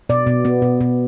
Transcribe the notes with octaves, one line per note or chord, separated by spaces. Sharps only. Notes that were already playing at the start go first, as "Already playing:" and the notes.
B2 D5
B2
B3
B2
B2